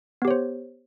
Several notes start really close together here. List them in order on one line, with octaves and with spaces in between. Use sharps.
B3 G4 C#5 C5